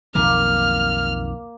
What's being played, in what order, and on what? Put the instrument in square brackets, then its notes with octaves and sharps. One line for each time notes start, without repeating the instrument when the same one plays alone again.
[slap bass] B1 F2 D#3 [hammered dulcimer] A#3 [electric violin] F6